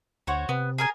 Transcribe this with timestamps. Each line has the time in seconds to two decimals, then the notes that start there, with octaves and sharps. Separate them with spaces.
0.27 D2 F#4 C5 C#5
0.49 C3 B3
0.78 G#4 A#4 G#5